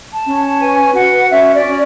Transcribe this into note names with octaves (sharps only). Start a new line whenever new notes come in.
A5
C#4
A5
B4 G#5
F#4 F#5
C#4 E5
D5
C#4